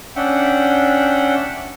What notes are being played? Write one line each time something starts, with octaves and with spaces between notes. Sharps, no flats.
C#4 D4 E5 F#5 G5